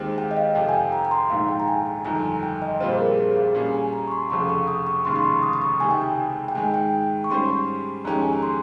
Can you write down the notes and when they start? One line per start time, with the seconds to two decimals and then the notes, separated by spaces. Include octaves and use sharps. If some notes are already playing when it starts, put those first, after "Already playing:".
Already playing: D#2 D#3 G#3 C4 G4
0.18 G5
0.31 D#5
0.37 F5
0.55 F2 C3 F3 G5
0.69 G#5
0.74 G5
0.92 A#5
1.05 A#5
1.11 C6
1.30 A#1 G#2 D#3 F5
1.49 G5
1.60 A#5
1.68 G#5
1.86 G#5
2.05 G1 F2 D#3 A#5
2.24 G#5
2.43 G5
2.62 D#5
2.80 A#1 A#2 G3 C4 F4 C5
2.92 G#4
2.99 A#4
3.17 G#4
3.37 F5
3.55 A#2 G3 C#4 G#4
3.74 G#5
3.93 A#5
4.07 C#6
4.12 C6
4.30 F1 F2 C#3 F3 C#6
4.49 C#6
4.68 D#6
4.87 C#6
5.05 F1 D#2 C#3 G#3 C6
5.16 C6
5.24 C#6
5.43 D#6
5.53 D#6
5.62 C#6
5.80 C#2 C3 D#3 G#5
5.91 G5
6.02 G#5
6.48 G5
6.55 G#2 D#3 G#3 G#5
6.74 G5
7.24 C#6
7.30 G#2 G3 C#4 G4 C5 C6
8.05 F2 D#3 G#3 C#4 G4 A#5
8.21 G#5
8.33 A#5
8.43 C6